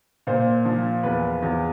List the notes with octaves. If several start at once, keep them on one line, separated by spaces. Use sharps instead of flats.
A#2 C5
F3
E2 B4
E2